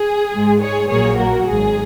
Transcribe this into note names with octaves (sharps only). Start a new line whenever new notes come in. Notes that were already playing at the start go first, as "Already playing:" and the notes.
Already playing: G#4
G#2 G#3
G#4 C#5
A#1 A#2 F#3 A#3 G#4 C#5
F#4 A#4
G#1 G#2 F#3 G#4